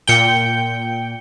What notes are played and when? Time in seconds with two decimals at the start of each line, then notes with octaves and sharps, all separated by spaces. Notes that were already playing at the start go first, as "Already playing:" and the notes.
0.08 A#2 G5 C#7 G7